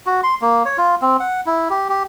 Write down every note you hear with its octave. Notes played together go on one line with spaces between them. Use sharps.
F#4
C6
A#3
C#5
F4
C4
F#5
E4
G4
G4